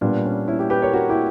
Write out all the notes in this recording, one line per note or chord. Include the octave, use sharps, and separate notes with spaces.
A#2 G3 B3 D4
C#4
C#4 E4
E4 G4
G4 B4
A#4 C#5
F#4 A#4
E4 G4